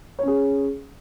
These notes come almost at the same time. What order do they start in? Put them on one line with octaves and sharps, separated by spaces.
C#5 C#4 G#4